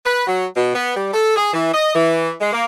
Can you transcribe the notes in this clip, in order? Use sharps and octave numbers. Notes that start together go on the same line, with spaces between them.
B4
F#3
B2
B3
G3
A4
G#4
E3
D#5
E3
G#3
A#3